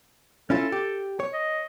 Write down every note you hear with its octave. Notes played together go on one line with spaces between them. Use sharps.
C#4 E4 F4 A4
G4
C#5
D#5